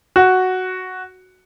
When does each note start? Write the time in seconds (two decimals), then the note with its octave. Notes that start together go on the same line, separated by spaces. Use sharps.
0.16 F#4